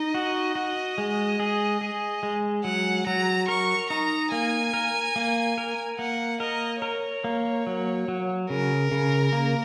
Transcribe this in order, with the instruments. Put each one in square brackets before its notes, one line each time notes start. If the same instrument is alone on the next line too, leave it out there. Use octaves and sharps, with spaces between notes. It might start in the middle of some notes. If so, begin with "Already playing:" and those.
Already playing: [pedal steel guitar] D#4 [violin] D#5
[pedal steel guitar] F#4
F#4
G#3
G#4
G#4
G#3
[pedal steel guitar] F#3 [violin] F#5
[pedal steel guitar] F#3 [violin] A#5
[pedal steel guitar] A#4 [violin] C#6
[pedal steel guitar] D#4 [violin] A#5
[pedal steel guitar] A#3 [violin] G#5
[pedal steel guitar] A#4
A#3
A#4
[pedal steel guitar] A#3 [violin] F#5
[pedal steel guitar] A#4 [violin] D#5
[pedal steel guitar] A#4 [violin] C#5
[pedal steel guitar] A#3
F#3
F#3
[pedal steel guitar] C#3 [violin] A#4
[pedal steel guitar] C#3
A#3